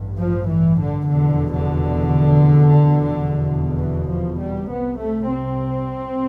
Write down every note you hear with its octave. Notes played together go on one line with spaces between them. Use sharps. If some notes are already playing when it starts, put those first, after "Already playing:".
Already playing: A1 G2
F3
E3
D3
F1 E2 B2 D3
D3
F1 E2 B2
E3
F3
G3
C2 C3 B3
A3
C4